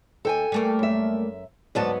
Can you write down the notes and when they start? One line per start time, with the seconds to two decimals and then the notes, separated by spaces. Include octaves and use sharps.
0.25 D#2 A4 G5 G#5
0.52 G3 A3 A#3
0.79 F#2 E5
1.75 D2 G#2 F#3 B3 D5 A5